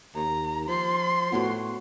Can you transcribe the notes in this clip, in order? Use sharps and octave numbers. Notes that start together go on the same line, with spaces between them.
D#2 A#5
F3 C6
A2 B3 F#4